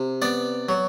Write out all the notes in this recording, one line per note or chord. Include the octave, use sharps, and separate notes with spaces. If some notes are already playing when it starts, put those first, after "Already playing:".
Already playing: C3
B3 D5
F#3